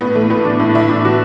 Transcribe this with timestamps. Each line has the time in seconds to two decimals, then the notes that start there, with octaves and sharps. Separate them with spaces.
0.01 A2 B3
0.15 E3 A3
0.30 A2 B3
0.45 E3 D4
0.60 A2 E4
0.75 E3 E4
0.89 A2 D4
1.05 E3 F#4